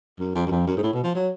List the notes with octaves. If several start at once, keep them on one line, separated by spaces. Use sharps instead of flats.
F#2
F2
F#2
F2
F#2
G#2
A2
B2
F3
F#3